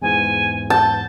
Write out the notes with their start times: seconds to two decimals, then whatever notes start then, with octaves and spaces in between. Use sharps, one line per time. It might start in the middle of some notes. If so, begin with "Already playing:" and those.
0.02 E2 G#2 E3 G#5
0.70 A5 G6